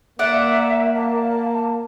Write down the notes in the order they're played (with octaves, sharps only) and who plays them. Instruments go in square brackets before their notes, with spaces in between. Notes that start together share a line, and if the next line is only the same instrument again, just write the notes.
[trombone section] A#3 [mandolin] D5 F#5 [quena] E5
[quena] A5